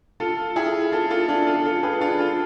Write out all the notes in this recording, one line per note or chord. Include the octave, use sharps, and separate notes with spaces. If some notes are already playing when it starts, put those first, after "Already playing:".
F4 A4
E4 G#4
F4 A4
F4 A4
D4 F4
F4 A4
F4 A4
G#4 B4
D4 F4
F4 A4